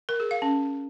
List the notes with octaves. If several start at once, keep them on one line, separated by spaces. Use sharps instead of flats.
A#4
G#4
F5
C#4